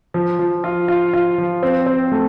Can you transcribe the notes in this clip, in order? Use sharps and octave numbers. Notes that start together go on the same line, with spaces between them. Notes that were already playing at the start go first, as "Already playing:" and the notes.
F3
F3
F4
F4
F4
F3
C4
C4
A3